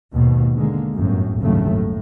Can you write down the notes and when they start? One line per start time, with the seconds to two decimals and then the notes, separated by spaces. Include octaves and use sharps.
0.12 D#2 G#2 B2
0.54 D3 G#3 A#3
0.94 G1 F#2 A2
1.40 G1 D#2 A2 C#3 F#3 A3
1.70 A2